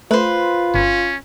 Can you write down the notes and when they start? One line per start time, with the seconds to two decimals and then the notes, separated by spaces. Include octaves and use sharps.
0.11 A3 F4 B4 C5
0.74 G1 C#4